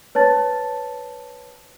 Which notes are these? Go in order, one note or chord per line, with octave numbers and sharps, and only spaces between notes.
B4 C#5 A5 A6